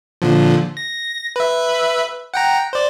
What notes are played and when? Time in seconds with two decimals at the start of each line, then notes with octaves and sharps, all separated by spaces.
0.22 A#2 D3 F3
0.77 A#6
1.36 B4 E5
2.34 F#5 G5 A#5
2.73 C5 D5